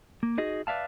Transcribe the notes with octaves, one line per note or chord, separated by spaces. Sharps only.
A#3
D#4 F#4 G#4 D#5
B4 D5 E5 F5 A5